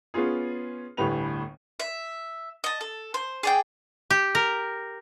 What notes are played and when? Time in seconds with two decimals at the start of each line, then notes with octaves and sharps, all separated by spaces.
0.14 B3 C#4 F4 G#4
0.97 G1 D2 A2 G3 B4 F7
1.80 E5
2.64 D#5 A5
2.81 A4
3.14 C5
3.43 G#4 D5 G5
4.10 G4
4.35 A#4